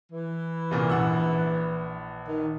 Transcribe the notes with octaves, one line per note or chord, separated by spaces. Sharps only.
E3
C2 A#2 C#3
A#1 F#5 E6
D#3